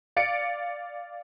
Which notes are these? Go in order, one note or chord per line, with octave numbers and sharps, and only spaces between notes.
D5 F5 C#7 D7